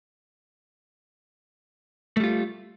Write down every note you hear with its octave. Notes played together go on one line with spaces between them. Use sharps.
G3 A3 F4